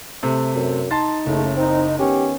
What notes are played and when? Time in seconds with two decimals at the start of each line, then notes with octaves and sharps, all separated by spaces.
0.23 C3 A3
0.55 F#2
0.91 D#4 A5 C6 A6
1.26 F#1 C#3 A3
1.57 C4 D#4
1.99 D#3 B3 C#4 G4